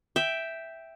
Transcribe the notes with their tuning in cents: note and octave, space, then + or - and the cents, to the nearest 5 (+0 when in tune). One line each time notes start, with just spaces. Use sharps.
E5 +0 G5 +0